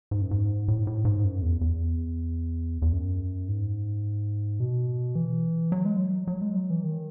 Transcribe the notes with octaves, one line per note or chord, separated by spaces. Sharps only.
G#2
F#2
G#2
A2
G#2
A2
G#2
F#2
E2
E2
E2
F#2
G#2
B2
E3
F#3
G#3
F#3
F#3
G#3
F#3
E3
D#3